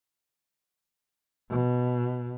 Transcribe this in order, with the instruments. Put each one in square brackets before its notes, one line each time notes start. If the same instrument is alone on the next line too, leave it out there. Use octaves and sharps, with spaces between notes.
[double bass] B2